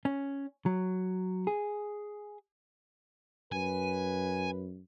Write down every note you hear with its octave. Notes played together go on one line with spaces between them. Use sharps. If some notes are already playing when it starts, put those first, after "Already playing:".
C#4
F#3
G#4
F#2 B4 G#5